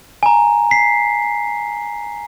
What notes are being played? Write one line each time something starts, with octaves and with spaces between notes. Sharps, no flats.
G#5 A#5
B6 C7